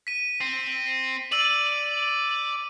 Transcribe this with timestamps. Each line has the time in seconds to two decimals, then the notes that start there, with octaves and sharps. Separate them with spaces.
0.07 B6 D#7
0.41 C4
1.32 D5 E6 D#7 F#7